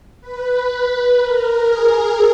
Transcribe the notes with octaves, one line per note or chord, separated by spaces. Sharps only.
B4
A#4
G#4